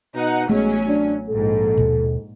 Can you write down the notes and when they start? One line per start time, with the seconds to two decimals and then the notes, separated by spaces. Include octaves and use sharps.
0.15 B2 D#4 F#5
0.49 A1 F#3 G#3 A3 B3 C#4
0.88 D4
1.29 A#1 G#2 A4
1.77 D#2 B2